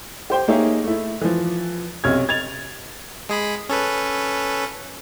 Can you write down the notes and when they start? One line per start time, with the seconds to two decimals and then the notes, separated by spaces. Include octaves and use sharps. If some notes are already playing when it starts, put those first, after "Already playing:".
0.30 G4 C5 G5
0.48 A#3 D#4 G4 G#4 C#5 E5
0.84 A3 E4
1.21 E3 F3
2.04 B1 C3 C#4 F6 G#6
2.29 G#6 A6 F7
3.29 G#3 G#4 B5
3.69 C#4 A4 B4